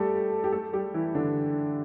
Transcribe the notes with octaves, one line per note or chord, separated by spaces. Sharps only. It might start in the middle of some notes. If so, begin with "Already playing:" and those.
Already playing: G3 A3 G4 A4
G4
A3 A4
G3 G4
E3 E4
D3 D4